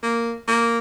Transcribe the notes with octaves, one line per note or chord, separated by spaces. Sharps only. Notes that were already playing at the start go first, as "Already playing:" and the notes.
A#3
A#3